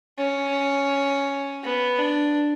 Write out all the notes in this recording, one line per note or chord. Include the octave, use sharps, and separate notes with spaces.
C#4
B3
D4